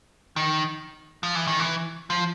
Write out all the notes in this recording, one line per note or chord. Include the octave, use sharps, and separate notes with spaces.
D#3
F3
E3
D#3
E3
F3